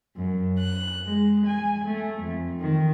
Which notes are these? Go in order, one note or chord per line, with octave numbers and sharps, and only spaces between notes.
F#2
F#6
G#3
G#5
A3
F2
D#3